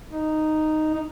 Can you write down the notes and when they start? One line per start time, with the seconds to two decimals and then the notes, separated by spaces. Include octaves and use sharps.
0.11 D#4
0.94 D#4